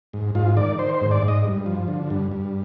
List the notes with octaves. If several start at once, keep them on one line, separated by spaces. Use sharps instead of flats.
G#2
G#2 F4
D#3 D5
D#3 C5
C5
G#2
D5
G#2
D#5
G2
F3
D3
G2
G2